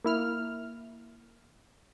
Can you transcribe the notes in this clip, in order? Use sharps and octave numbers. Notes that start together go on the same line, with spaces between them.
A#3 E4 F6